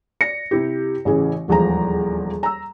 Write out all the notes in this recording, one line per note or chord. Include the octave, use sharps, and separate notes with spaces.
D5 A#6 C#7
C3 E4 G4
A1 C#3 E3 G#4
D#1 E2 F3 G#3 A#5
A#5 E6